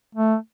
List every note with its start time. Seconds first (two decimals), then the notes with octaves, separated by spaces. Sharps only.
0.15 A3